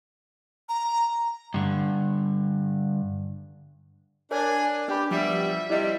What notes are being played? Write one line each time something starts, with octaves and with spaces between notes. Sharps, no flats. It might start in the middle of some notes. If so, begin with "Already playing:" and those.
A#5
G2 D3
D4 A#4 C#5 G#5
D4 G4 B4 B5
B2 F3 G3 E5
C3 G3 E4 C5 D#5